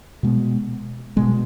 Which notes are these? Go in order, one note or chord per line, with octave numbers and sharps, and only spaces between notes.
B2 G#3 B3
B2 G#3 B3